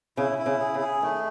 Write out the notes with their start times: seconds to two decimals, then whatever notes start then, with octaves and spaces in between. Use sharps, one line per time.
0.17 C#3 E4
0.38 E4
0.46 C#3
0.60 G#4
0.75 C#3
0.81 G#4
1.02 D#3 A3